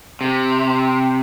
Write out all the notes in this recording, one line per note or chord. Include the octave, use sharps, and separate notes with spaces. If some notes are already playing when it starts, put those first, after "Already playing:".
C3